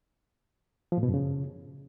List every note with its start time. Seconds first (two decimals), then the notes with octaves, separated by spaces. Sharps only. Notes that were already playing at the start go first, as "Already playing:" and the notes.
0.92 F3
0.98 A2
1.03 B2
1.08 F#2
1.14 C#3